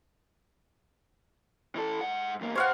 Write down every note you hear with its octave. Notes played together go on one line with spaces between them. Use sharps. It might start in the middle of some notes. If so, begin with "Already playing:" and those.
E3 A4
G#2 F#5
E2 A#3
G4 C5 C#5 F5 F#5